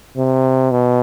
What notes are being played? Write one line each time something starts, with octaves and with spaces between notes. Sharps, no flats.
C3
B2